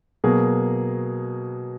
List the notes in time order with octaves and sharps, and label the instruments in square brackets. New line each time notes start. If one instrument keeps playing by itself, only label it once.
[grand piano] B2 F#3 A#3 G#4